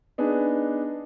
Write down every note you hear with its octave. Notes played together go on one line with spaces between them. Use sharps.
B3 D4 D#4 G#4 B4